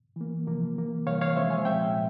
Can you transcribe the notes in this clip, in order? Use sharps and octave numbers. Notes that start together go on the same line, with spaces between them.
E3 A#3
C3 F3 A#3
E3 A#3
C3 E3 G3 A#3 C#5 F5
C#5 F5
C3 F3 G#3 C4 C5 E5
F5 G#5
A#2 F3 G#3 C4 E5 G5